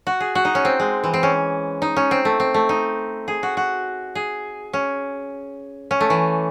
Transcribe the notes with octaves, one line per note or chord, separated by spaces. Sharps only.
F#4
G#4
F#4
D#4
C#4
C4
G#3
E3
C4
C#4
D#4
C#4
C4
A3
C4
A3
D#4
G#4
F#4
F#4
G#4
C#4
C#4
A3
E3